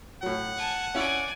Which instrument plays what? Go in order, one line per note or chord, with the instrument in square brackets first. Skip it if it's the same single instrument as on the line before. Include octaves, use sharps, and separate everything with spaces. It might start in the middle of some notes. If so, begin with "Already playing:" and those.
[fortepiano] A2 F#3 [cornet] F#5
[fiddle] G#5 A5
[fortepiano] C#4 E4 [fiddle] D5 G#5